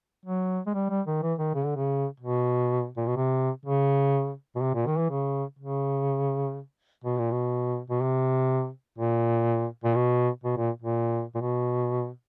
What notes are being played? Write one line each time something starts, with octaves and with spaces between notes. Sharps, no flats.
F#3
G#3
G3
G3
D#3
E3
D#3
C#3
D3
C#3
B2
A#2
B2
C3
C#3
B2
C3
A#2
D#3
E3
C#3
C#3
B2
A#2
B2
B2
C3
A#2
A#2
B2
B2
A#2
A#2
A#2
B2